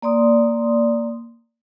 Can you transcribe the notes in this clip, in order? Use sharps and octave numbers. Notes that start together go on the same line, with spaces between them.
A#3 D5 C6 D#6